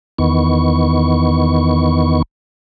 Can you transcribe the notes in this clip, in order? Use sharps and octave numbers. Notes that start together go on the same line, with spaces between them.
E2 D#3 B3 C#6